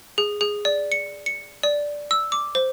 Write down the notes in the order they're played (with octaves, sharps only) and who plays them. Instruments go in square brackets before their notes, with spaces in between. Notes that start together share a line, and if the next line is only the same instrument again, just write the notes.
[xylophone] G#4
G#4
D5
C#7
C#7
D5
E6
D6
C5